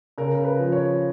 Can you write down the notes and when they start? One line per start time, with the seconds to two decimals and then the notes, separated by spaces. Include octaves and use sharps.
0.18 C#3 A#4
0.35 A#4
0.45 B4
0.59 F3
0.72 C#5